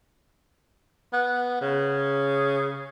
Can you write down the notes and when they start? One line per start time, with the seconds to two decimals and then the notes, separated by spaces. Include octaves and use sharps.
1.13 B3
1.61 C#3